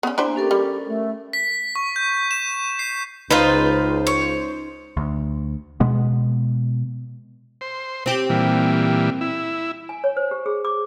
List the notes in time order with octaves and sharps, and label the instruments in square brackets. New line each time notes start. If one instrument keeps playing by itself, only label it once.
[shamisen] B3 C#4 [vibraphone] D5 F#5
[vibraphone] A#3 G#5 [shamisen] D4 E4 C5
[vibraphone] C#4 A4 A#4 [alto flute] G4
[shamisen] G3
[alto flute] A3
[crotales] B6
C#6
G6
E7
C7
[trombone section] C#2 [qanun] D#4 [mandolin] F4 B4 [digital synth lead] C5
[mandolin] C#5
[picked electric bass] D2
B2 G#3 B3
[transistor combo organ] C5
[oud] C4 G4
[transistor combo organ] A#2 E3 G3
E4
[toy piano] G#5
C#5
C5
G4
G#4
D6